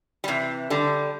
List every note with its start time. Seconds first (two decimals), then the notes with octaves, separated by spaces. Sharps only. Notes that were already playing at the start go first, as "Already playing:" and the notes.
0.24 G3
0.28 C3 E3
0.70 D3 G3